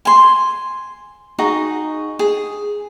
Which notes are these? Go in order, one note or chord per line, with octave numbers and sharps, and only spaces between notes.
G#5 C6
D#4 F#4 G#4
G#4